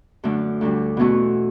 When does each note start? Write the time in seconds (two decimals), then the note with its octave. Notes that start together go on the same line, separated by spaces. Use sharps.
0.24 F#2 D3 A3 D4
0.61 D2 D3 G3
0.97 E2 B2 A3 C#4 F#4